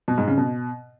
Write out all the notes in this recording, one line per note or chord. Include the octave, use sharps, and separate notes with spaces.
B2
G#2
C#3
B2